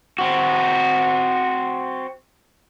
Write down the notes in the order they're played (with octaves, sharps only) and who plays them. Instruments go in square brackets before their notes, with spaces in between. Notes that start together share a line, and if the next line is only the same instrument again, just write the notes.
[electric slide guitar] C4 F#4